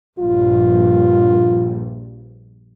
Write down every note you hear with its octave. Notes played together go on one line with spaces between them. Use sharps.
A#1 G2 F4